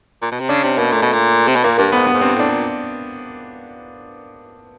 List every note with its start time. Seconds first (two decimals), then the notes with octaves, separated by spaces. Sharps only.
0.22 A#2
0.31 B2
0.40 C3
0.49 C#3 D4
0.63 C3 C#4
0.77 B2 A#3
0.92 A#2 A3
1.02 B2
1.13 A#2
1.47 C3
1.55 B2
1.64 A#2 A#3
1.78 G2 A#3
1.92 G#2 B3
2.06 G2 B3
2.14 G#2
2.21 G2 C4
2.35 A2 D4
2.50 A#2